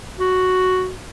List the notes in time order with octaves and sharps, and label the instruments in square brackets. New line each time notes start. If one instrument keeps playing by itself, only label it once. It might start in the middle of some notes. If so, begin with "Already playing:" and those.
[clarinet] F#4